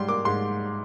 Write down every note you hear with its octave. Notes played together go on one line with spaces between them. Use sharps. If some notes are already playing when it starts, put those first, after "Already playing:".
Already playing: G#2 G3 C6
A#3 D6
G#2 C6